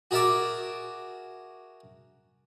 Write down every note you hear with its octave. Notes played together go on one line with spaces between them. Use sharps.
F#4 G#4 A#4 E5 A5 D6